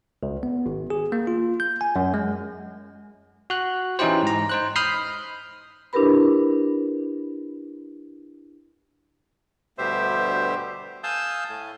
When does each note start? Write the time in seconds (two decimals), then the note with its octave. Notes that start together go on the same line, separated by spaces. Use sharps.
0.23 C#2
0.43 B3
0.66 G#1
0.90 G#4
1.12 A#3
1.27 F4
1.60 G6
1.81 G#5
1.96 F#2
2.14 G#3
3.50 F#4 F#6
3.99 E3 C#4 D#4 E4 G4 C5
4.23 G#2 A#5
4.49 D#4 C5 F#6
4.76 B5 D#6 F6 G6 B6 C7
5.93 D4 E4 G4 A#4 B4 B5
9.78 D2 G2 B2 G4 C5 E5
11.03 F5 G#5 A5 D#6 E6 G6
11.49 A2 A3 G#5